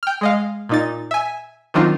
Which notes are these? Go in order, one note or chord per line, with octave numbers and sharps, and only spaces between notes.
G5 F6
G#3 D#5 F5
A#2 D#4 A6
E5 G#5
D#3 F#3 C4 D4 D#4 F4